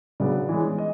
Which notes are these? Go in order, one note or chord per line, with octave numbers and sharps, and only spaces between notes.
C#3 F#3 B3 D4 D5
E3 G#3 C#4
D#5